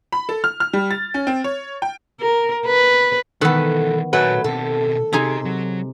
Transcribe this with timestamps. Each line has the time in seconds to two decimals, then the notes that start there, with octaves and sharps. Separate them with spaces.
0.12 B5
0.29 A4
0.44 F6
0.60 F6
0.73 G3
0.91 A6
1.14 C#4
1.27 C4
1.44 C#5
1.82 G5
2.21 A#4
2.66 B4
3.41 B1 D#3 E3 B3 A4 B4
4.13 A#2 F#3 A3 B4 F#5 G#5
4.44 B2 C4 A4
5.13 C3 C4 D#4 G4 G#4
5.45 F#3